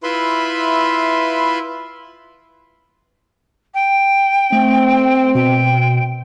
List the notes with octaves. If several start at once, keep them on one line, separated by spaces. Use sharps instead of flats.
E4 F4 B4 E5 B5 C6
G5
A3 C4
B2 G5